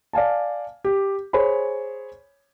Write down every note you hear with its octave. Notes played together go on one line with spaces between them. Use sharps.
D5 F5 G#5 A5
G4
G#4 C5 C#5 G#5 B5